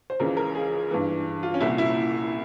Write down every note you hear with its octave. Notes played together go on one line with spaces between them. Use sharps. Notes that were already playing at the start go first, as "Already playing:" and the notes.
C5
C#2 C#3 E3 A#4
A#4
G#4
G2 E3
F4
C#4
C2 A#2 E4
E4